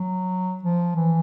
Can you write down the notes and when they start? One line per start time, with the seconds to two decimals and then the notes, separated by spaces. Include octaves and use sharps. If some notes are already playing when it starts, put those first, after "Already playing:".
Already playing: F#3
0.63 F3
0.96 E3